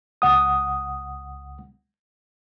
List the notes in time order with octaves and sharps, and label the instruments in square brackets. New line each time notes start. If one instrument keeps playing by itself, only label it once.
[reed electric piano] C#2 F#5 D#6